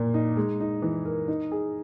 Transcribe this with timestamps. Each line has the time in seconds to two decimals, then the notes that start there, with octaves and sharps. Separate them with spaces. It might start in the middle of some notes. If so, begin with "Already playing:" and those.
Already playing: A#2 A#3
0.14 D#4
0.37 G#3
0.60 D#4
0.82 E3
1.05 A#4
1.28 D#4
1.52 G#4